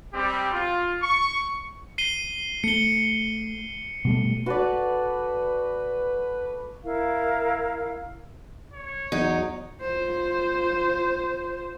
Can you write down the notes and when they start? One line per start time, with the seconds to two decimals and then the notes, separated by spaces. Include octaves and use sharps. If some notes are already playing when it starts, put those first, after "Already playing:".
0.13 G3 C4 G4
0.52 F4
1.01 C#6
1.98 C7 D#7 G7
2.64 A3 C#7 G7
4.05 B2 G3 A3
4.46 F#4 A4 B4 D5
6.84 E4 A#4 F5
8.73 C#5
9.12 E2 F#3 D#4
9.81 F4 C5